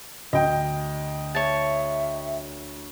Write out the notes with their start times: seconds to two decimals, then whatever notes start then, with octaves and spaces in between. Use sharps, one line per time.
0.33 D2 D3 D#5 G5
1.35 C#5 E5 A5